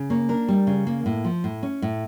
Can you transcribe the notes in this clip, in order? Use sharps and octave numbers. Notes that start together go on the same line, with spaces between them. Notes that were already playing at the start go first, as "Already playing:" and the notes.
Already playing: C#3
A#3 C#5
D4 A#4
G3
C#3
A#3
A2
F3
A2
C#4
A2